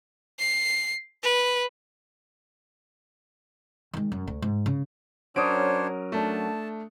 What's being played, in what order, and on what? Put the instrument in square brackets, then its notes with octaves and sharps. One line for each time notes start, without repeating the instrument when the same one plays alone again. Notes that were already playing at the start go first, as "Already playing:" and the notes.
[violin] C7
B4
[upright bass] D#3 G#3
F#2
D2
G#2
C#3
[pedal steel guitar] F#3 C#4 A#4 [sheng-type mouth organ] D4 C5 C#5 [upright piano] D#6 D7
[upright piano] A3 D4 [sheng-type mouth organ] A5